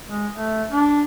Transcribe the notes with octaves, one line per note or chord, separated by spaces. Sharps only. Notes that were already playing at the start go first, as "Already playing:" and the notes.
G#3
A3
D4